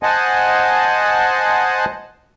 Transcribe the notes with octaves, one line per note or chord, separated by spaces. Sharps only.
C5 D#5 F#5 G#5 A5